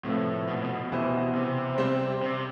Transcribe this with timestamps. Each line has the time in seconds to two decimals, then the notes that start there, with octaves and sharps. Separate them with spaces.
0.04 A2 C3 F3 A3 E4 B4
0.47 B2
0.56 A2
0.64 B2
0.92 E3 B3 E4 G4 C5
1.35 C3
1.78 G3 C4 G4 C5
2.23 C3